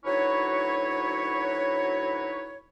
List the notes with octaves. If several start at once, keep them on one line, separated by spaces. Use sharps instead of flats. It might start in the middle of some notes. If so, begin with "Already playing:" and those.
D2 F#3 D#4 E4 B4 C#5